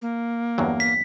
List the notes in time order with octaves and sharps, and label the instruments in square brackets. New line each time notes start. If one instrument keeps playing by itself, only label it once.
[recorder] A#3
[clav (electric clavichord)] E2 G2 F#3
[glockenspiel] B6